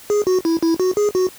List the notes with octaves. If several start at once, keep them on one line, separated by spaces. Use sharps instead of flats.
G#4
F#4
E4
E4
F#4
G#4
F#4